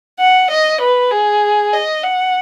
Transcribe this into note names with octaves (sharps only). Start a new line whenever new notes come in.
F#5
D#5
B4
G#4
D#5
F#5